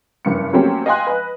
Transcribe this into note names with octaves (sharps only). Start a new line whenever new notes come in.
F#1 G2 C#7
F#3 A3 A#3 C4 C#4 G4
D#5 F5 G5 G#5 C6 F#6
B4 D#5